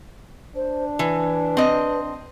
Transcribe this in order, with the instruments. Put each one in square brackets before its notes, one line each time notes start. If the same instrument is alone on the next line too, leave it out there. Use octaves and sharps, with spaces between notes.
[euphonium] D4 [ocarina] C5
[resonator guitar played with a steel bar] E3 [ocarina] B4
[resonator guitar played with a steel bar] C4 D#5